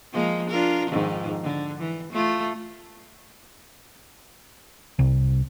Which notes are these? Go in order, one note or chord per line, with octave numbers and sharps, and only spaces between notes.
F3 G#3 A#3
D4 F4 A#4
F2 G#2 D#3
D3
E3
A3 F4
C2